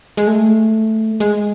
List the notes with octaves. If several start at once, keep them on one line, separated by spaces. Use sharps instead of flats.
G#3
A3
G#3